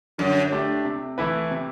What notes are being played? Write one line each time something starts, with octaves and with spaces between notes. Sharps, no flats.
F#2 D3
A3 D4 G4
C3
E3 A3 E4 B4
C3